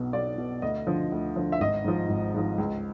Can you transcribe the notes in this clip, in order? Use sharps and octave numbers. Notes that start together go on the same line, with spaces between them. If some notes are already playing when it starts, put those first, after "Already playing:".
Already playing: B1 B2
B1 D5
B2
D2 D#5
D3 F3
D2
D3 F3
E5
G#1 D#5
G#2 F3
G#1
G#2 F3
C#2